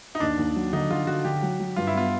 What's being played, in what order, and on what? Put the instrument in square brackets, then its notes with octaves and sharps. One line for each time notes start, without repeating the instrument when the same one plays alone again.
[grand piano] D#4
[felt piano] D#2 [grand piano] D4
[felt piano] D#2
F#3
[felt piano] D3 [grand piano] D#4
[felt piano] D3 [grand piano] F4
[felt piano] D3 [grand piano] F#4
[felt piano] D3 [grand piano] G4
[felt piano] F#3
F#3
[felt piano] G2 [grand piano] F4
[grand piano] E4
[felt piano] B3 [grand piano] F4